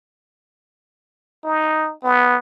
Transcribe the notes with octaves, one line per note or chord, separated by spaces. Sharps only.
D#4
B3